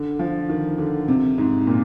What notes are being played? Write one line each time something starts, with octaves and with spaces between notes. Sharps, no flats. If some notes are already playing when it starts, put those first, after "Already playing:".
Already playing: D3
F3
D#3
D3
C3
G#2
A#2